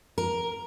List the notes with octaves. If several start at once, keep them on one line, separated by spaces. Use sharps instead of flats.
A#4